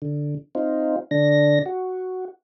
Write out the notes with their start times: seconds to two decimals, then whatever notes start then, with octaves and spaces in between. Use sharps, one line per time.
0.02 D3
0.55 C4 D#4 F4
1.11 D3 D4 A#6
1.66 F#4